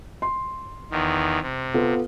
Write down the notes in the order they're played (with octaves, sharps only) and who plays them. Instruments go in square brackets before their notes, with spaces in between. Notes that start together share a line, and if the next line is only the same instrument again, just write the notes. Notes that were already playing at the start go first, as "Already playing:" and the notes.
[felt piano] C6
[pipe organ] E2 D#3
C3
[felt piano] B3 F4 A4